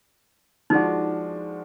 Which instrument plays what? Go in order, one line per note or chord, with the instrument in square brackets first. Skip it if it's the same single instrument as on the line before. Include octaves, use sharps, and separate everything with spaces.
[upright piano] F3 G#3 D4 F#4 [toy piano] D#4